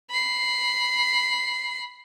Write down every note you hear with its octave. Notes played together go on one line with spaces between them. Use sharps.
B5 C7